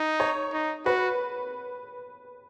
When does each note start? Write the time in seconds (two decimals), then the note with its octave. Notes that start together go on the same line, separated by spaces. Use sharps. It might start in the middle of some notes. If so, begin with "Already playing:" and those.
Already playing: D#4
0.20 C#5
0.53 D#4
0.86 F#4 B4